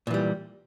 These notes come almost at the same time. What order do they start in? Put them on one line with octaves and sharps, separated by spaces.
A#2 E3 G3